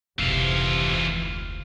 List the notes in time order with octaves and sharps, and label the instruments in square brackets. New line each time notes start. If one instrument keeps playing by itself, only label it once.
[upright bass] F1 D2 [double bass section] G#2 C3 [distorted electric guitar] E3 F4